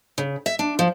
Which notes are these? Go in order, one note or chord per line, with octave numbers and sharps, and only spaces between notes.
C#3
E5
D4
F3